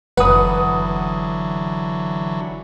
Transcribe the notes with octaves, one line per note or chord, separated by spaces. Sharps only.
F#1 D3 E3 F#3 B4 F#5 D#6